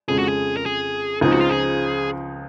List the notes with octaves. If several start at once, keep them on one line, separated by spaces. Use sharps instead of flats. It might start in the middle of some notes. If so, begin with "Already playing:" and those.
F2 C#3 G#3 G#4
F#4
G#4
A#4
G#4
C#2 C#3 F3 C4 D#4 G#4
F#4
F4
G#4